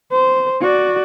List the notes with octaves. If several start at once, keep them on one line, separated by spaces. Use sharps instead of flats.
C5
F#4 D5